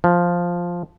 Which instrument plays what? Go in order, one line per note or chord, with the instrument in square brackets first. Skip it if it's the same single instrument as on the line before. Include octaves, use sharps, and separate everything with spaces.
[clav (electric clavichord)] F3